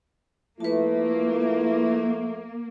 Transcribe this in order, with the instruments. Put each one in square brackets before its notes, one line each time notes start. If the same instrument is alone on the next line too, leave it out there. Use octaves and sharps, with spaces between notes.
[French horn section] F3 A3 [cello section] A#3 [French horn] E4 [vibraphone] B4 A5